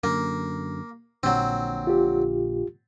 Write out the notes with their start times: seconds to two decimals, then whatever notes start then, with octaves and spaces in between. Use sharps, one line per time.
0.04 F#2 D3 A#3
1.23 A#1 A#2 D3 F#3 C4
1.87 F4 G4